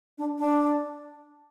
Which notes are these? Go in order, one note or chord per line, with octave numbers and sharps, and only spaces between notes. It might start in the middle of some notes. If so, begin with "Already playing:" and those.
D4
D4